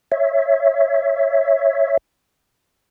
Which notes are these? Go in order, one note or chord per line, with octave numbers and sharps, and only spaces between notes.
C#5 E5